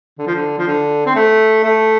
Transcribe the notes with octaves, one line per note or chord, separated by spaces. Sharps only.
D3
F3
D3
F3
D3
C4
A3
A3